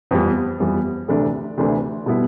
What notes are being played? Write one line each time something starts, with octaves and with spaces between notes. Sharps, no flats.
F2 E3 G3 B3
F2 E3 G3 B3
D2 C3 E3 A3 D4
D2 C3 E3 A3 D4
B2 G3 B3 E4